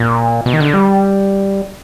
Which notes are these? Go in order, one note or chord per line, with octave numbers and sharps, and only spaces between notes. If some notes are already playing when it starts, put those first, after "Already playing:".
Already playing: A#2
B2
D#3
D3
G3